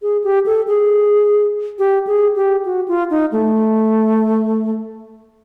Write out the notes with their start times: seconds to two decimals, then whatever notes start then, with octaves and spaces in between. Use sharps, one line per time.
0.02 G#4
0.24 G4
0.46 A4
0.67 G#4
1.79 G4
2.07 G#4
2.36 G4
2.65 F#4
2.88 F4
3.10 D#4
3.32 A3